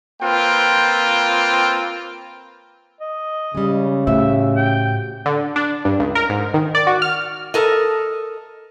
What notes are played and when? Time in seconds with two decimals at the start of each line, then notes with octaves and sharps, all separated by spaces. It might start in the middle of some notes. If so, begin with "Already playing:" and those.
0.22 A#3 C4 F4 B4 G5
3.01 D#5
3.55 C#3 G3 G#3
4.07 A2 F#4 G4 C5 E5
4.56 G5
5.26 D3
5.56 D4
5.85 G2
5.99 C#2
6.15 A#4
6.29 G#2
6.54 D#3
6.75 D5
6.87 F#4
7.02 F6
7.54 A4 A#4 D#5